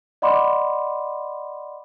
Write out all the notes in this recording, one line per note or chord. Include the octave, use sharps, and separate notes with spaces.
D5 D#5 F#5 B5 C6 D6